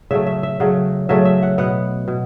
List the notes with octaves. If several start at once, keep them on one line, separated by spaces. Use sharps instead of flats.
C#3 F#3 A3 E5
E5
E5
C#3 F#3 A3 F#5
C#3 F#3 A3 E5
E5
F#5
B2 B3 F#5
B2